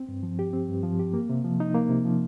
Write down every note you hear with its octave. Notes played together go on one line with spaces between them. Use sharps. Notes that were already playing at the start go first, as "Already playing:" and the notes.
Already playing: C4
G2
F3
G4
C4
G2
F3
G4
A#3
C3
F3
D#4
A#3
C3
F3